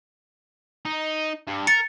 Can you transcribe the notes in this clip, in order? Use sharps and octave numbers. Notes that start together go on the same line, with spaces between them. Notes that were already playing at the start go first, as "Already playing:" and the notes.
D#4
G2
A#4 A6 C#7